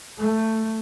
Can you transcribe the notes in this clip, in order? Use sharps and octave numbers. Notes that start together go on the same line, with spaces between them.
A3